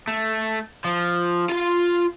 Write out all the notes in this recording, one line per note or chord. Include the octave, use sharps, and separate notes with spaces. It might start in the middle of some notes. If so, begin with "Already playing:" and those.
A3
F3
F4 C6